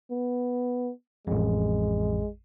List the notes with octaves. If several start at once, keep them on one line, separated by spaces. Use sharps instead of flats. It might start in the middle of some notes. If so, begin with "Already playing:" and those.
B3
A1 F2 G#3